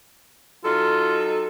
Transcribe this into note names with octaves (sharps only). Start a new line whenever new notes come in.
F#3 D#4 F4 A4